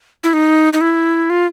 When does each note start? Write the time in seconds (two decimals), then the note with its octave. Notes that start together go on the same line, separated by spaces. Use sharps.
0.24 E4
0.33 D#4
0.73 D#4
0.81 E4
1.30 F4